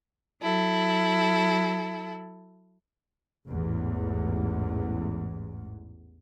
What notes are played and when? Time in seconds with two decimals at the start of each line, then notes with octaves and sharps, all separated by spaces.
0.42 F#3 E4 A4
3.48 A1 E2 G#2